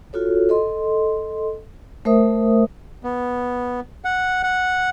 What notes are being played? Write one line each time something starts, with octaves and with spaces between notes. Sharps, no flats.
F4 F#4 A4 C#5
A4 D#5 C6
A3 A#4 C5 E5 D#6
B3
F#5
F#5